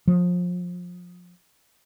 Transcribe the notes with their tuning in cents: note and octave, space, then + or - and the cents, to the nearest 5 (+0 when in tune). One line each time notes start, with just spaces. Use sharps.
F3 +30